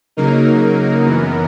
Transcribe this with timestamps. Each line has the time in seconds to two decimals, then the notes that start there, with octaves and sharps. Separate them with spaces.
0.17 C#3 F#3 A#3 D#4 A#4
1.05 F#2 E3 B3